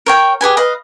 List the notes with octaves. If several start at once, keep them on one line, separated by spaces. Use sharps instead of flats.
A#4 C#5 G5
G4 G#4 B4 G#5
B4 D#5 F5